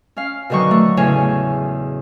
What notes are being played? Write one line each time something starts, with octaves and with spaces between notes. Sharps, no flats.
C#4 F5
B2 D3 D#3 F#3 C#6
A3
E2 A2 C#3 C#5 G#5